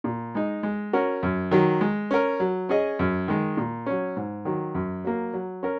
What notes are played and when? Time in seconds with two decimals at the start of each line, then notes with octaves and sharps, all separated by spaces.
0.04 A#2
0.35 G#3 D#4
0.63 G#3
0.93 C#4 F#4 A#4
1.23 F#2
1.51 D#3 F#3
1.81 G#3
2.11 C#4 A#4
2.40 F#3
2.69 C#4 G#4 D#5
2.99 F#2
3.28 D#3 G#3
3.57 A#2
3.86 F#3 C#4
4.16 G#2
4.45 D#3 F#3
4.75 F#2
5.05 F#3 A#3
5.33 F#3
5.63 C#4 A#4